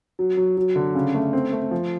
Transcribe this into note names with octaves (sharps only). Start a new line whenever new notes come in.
F#3
F#3
F#3
D3
C#3
A3
C4
A3
F3